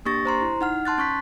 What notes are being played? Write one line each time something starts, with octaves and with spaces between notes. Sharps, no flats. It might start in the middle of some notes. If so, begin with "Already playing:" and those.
A#3 D4 G4 C#6 A6 A#6
C5 A#5 C6
E4
D#4 F#5 F6
A5 C6 F#6 A6
C#4 C#6 F#6 B6